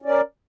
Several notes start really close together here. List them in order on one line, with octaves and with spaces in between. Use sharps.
C#4 D5 A#4